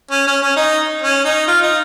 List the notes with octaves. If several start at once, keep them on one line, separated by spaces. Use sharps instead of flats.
C#4
C#4
C#4
D#4
C#4
D#4
F4
D#4